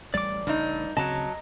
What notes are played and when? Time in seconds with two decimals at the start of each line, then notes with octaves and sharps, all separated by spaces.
0.14 A1 G3 D5 D6
0.47 A1 G2 C#3 D4 D#4
0.97 D2 C#3 F#3 C4 D#5 A5 A#5